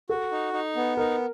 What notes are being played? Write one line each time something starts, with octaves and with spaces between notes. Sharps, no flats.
F#4 A4
D#4
D#4
B3
D#4 A#4